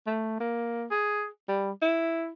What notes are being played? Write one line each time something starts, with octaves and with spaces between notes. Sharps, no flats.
A3
A#3
G#4
G3
E4